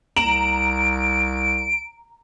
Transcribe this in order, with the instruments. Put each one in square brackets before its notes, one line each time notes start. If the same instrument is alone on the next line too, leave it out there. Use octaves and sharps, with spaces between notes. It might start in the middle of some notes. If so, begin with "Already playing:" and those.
[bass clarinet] C2 [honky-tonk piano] A#5 E7 F#7 [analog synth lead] D7